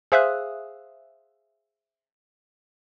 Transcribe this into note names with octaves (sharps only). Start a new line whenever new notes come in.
G#4 C5 E5 F5 D#6 F#6